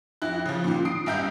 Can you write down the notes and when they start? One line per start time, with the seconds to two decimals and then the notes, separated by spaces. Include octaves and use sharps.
0.22 F2 E4 F#6
0.46 C#3 F3
0.64 A#2 D#3
0.85 D#6 C7 D7
1.06 B1 G2 E5 A#5 G6